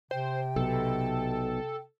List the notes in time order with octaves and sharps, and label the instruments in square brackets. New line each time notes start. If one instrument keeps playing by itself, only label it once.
[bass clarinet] C3 [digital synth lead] C5 [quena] G5
[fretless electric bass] B1 B2 [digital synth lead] A4